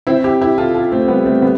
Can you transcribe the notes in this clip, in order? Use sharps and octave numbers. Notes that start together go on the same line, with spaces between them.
C4 E4
E4 G4
E4 G4
F4 A4
F4 A4
A3 C4
G3 B3
A3 C4
G3 B3